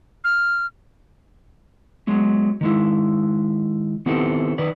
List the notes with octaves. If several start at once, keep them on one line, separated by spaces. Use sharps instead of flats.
F6
F#3 G#3 B3
D#3 G#3 E4
D#3 B3 C4 E4 G4 A4
D#3 B4 D5